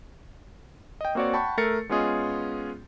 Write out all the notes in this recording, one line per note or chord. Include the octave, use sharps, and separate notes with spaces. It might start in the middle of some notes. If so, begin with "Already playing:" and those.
D#5 G5
A#3 C4 F#4 C#5 D5
F#5 G5 A5 B5 C#6 G6
A3 A4 A#4 A6 C7 C#7
G#3 B3 C#4 F4 G#4 D#5